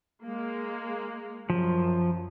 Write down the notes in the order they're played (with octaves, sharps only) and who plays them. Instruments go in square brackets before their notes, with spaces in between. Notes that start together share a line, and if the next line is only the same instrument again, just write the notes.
[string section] G#3 A#3
[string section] F#2 [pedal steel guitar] F3